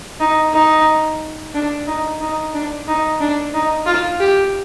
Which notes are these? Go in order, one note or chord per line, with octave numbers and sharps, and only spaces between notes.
D#4
D#4
D4
D#4
D#4
D4
D#4
D4
D#4
F4
G4